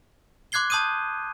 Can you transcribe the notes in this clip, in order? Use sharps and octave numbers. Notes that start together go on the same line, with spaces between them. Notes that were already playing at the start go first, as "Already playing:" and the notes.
C6 D6 F#6 G#6 C7 G7
A5 C6 D#6 G6 D#7